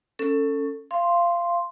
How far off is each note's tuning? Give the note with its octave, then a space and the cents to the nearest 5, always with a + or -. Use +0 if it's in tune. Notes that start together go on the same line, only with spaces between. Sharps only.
C#4 +0 A4 +20
F5 -20 C6 +0